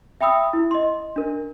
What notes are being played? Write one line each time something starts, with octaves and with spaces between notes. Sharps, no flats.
E5 G5 B5 D#6 E6
E4
D#5 C6
D4 A#4